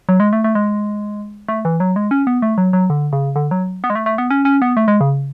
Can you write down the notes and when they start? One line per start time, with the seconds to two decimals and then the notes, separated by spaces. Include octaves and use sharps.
0.09 F#3
0.20 G#3
0.33 A3
0.44 A3
0.55 G#3
1.48 A3
1.65 E3
1.80 F#3
1.96 G#3
2.11 C#4
2.27 B3
2.42 A3
2.58 F#3
2.73 F#3
2.90 D3
3.13 C#3
3.36 D3
3.51 F#3
3.84 B3
3.90 G#3
3.95 A3
4.06 A3
4.18 B3
4.30 C#4
4.45 C#4
4.62 B3
4.77 A3
4.88 G#3
5.01 C#3